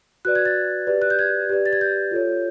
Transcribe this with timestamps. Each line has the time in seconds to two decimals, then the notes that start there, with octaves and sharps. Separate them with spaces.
0.25 F#4 B4 D5 F#6
0.35 G#6
0.45 A6
0.87 G4 B4 D5
1.02 F#6
1.10 G6
1.19 G#6
1.49 G4 B4 D5
1.66 A6
1.73 G#6
1.81 G6
2.11 F4 A4 C#5